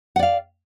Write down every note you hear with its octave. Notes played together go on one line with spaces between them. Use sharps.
D5 F5 F#5